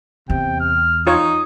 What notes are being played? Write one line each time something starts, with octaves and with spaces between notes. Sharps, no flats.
E2 C3 G5
F6
D#4 F4 C#5 D#6